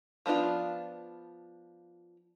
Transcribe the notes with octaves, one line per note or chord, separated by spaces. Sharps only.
F3 B3 D4 F4